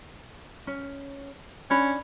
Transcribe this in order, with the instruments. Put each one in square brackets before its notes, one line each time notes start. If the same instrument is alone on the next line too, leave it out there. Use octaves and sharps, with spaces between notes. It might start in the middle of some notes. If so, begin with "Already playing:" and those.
[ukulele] C#4
[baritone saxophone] C#4 [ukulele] D4 B5